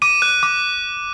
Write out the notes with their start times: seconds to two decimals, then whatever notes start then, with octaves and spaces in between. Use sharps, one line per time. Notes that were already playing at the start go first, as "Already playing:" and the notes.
0.02 D6 D#7
0.22 F#6
0.43 D6